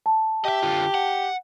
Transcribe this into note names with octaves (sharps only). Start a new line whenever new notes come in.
A5
G4 D#5 E5
D3 F4
F#5